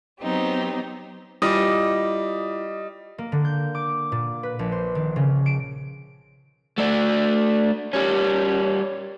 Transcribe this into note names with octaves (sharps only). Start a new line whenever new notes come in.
F#3 B3 C4 D#4 G4
G3 E4 F4 D#5 D6
A#3
D3
G6
D6
A#2
B4
A#1
C5
D#3
C#3
D7
A3 D4
G3 C#4